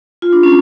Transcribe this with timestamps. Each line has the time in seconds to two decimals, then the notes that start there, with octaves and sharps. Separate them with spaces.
0.22 F4
0.33 D4
0.43 C#4